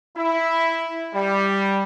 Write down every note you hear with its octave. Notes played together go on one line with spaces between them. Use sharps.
E4
G3